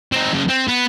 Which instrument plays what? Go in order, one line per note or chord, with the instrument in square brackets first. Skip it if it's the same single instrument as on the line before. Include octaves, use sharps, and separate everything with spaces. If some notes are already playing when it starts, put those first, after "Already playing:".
[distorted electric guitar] C4 D#4
F#2 C#3
C4
B3